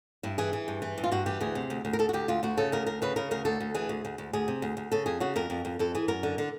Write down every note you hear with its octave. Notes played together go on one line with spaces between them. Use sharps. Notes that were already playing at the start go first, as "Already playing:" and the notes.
G2 E4
E3 G#4
E3
G2
E3
G2
F4
G2 F#4
E3 G4
D2 G#4
C3
D2
D2
A#4
D2 A4
F#4
D2 G4
D2 F4
D2 F#4
C#3 A4
D2 A#4
D2 A#4
C#3 B4
C#3 A#4
D2 A#4
D2 A4
D2
E3 G#4
D2
D2
D2
D2 G#4
C3
D2
D2
C#3 A4
F2 G#4
C#3 F#4
F2 A#4
F2
F2
F2 A4
E3 G#4
F#2 A#4
D3
D3